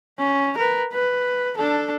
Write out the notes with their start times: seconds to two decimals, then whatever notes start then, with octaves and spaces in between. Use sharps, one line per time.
0.19 C#4
0.57 A#4 B4
0.93 B4
1.57 D4 A4